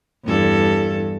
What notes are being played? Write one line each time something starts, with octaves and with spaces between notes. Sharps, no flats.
E2 G2 A4